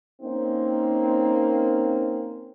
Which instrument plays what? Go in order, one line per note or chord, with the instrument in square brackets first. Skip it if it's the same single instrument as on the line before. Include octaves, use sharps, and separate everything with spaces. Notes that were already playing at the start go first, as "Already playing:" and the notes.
[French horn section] A#3 C4 C#4 D#4